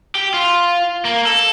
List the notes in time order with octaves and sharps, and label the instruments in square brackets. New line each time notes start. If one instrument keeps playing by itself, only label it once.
[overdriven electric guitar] G4
F4
A#3
A4